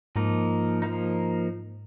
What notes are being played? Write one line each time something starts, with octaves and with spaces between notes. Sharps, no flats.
G#2 F3 A#3 D#4
F3 A#3 D#4